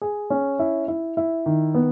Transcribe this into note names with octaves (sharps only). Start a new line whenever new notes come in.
G#4
C#4
E4
E4
E4
D#3
B3